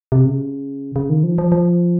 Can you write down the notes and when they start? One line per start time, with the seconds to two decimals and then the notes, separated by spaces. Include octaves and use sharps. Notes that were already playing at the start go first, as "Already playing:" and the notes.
0.12 C3
0.25 C#3
0.96 C#3
1.10 D#3
1.23 F3
1.38 F3
1.52 F3